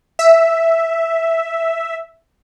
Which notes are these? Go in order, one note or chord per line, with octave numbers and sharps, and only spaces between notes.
E5